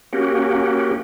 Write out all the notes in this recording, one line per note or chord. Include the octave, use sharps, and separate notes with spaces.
A#3 C#4 F#4 G4